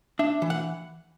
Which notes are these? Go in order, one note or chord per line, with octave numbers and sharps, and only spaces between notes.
D4 E5
E3
F#5